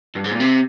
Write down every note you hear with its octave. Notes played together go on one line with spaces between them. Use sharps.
G2
G#2
A#2
C3